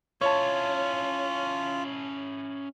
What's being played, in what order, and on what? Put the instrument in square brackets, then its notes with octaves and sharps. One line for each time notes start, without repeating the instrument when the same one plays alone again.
[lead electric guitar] C#4 E4 [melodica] F4 [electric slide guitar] C#5 [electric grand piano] A5 C#6